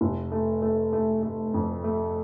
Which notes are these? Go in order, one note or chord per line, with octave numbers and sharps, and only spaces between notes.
F1
A3
A3
A3
A3
F2
A3